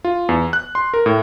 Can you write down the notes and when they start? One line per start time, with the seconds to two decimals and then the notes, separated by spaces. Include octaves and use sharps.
0.04 F4
0.29 E2
0.53 F#6
0.75 C6
0.94 A#4
1.06 A2